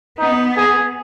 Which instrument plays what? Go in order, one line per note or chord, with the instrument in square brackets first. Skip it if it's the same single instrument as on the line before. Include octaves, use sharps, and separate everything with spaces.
[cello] B3 [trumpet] D#4
[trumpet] G#4